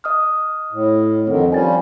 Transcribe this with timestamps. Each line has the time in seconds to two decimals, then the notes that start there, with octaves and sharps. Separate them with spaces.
0.04 D#5 D#6 F6
0.72 A2
1.27 F2 D3 D#3 C4
1.52 F3 G3 C#4 G#5 A6